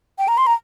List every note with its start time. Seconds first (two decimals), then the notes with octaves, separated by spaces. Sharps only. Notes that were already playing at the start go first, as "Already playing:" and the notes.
0.18 G5
0.28 A#5
0.37 C6
0.47 A#5